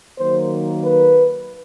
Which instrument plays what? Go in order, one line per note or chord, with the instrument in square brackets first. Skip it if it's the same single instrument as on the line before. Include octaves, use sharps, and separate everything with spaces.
[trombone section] D#3 F#3 A#3 C5
B4